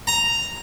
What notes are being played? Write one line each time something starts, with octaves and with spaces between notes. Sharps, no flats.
A#5